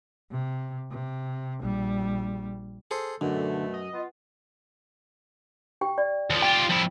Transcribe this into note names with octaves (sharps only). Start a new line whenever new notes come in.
C3
C3
A#1 G3
G#4 A4 C5
F#2 B2 D3 A3
D#5
B3 F4
G4 G5
D5
D#2 F3
F4 G4 G5
F2 E4